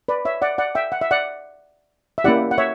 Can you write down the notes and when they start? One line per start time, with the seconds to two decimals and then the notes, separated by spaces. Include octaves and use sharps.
0.08 B4 D5
0.25 C#5 E5
0.42 D5 F#5
0.58 D5 F#5
0.75 E5 G5
0.92 F#5
1.01 E5
1.11 D5 F#5
2.18 E5
2.24 A#3 C#4 E4 G4 D5 F#5
2.51 F#5
2.58 C#5 E5